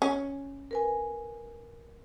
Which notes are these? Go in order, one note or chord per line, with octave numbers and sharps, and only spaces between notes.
C#4
A#4 B4 G#5